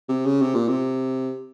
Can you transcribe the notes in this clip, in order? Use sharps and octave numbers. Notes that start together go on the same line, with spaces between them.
C3
C#3
C3
A#2
C3